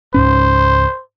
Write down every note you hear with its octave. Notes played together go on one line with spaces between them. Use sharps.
C#2 G#2 C#4 C5